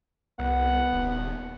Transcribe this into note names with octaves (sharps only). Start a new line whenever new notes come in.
C2 B3 F#5
D#1